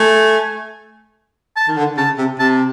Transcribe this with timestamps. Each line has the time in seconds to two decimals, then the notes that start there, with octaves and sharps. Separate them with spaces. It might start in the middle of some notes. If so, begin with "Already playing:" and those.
Already playing: A3 G#5
1.56 A5
1.68 D#3
1.77 D3
1.97 C#3 A5
2.18 C3
2.39 C3 A5